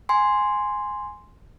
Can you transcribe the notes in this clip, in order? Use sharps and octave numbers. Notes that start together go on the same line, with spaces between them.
G#5 C6